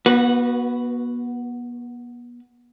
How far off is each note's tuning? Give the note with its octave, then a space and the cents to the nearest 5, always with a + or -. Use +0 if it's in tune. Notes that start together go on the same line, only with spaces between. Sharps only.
B3 -40 F#4 +0 B4 +0